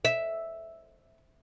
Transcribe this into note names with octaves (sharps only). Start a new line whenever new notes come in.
E5